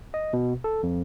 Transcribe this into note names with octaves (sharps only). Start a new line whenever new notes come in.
D#5
B2
A4
F2